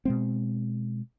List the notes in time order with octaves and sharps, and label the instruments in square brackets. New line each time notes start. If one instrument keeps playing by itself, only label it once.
[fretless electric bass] B2 G#3 C4